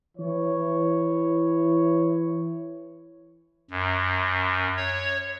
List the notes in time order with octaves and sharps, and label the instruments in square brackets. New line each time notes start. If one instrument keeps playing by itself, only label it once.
[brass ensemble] E3 C#5
[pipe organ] F#2
C#5